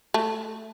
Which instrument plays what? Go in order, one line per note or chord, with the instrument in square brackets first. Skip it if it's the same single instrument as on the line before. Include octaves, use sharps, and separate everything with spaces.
[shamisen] A3